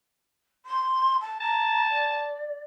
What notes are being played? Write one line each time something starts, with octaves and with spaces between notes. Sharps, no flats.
C6
A5
A5 A#5
D5